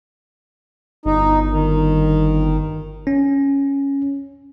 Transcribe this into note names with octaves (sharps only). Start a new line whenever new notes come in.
G1 D#4
D#3
C#4